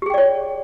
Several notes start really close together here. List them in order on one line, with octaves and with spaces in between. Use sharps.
G4 G#4 G5 D5 C#5